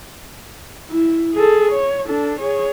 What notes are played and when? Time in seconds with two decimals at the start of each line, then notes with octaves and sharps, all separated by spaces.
0.91 E4
1.34 G#4 A4
1.72 C#5
2.05 D4 A4
2.40 G#4 C#5